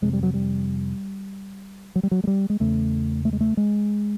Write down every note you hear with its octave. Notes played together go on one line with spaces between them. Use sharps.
F2 C3 G#3
G3
F#3
G3
F#3
G3
F#3
G#3
G3
G#3
E2 C#3 A3
A3
G#3
A3
G#3